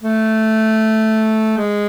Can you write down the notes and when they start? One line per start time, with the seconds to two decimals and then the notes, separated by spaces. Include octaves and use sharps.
0.03 A3
1.57 G#3